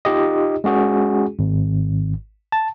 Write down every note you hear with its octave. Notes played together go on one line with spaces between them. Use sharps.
D#4 F4 G4 D#5
G#3 C#4 F#4 G#4
G#1
A5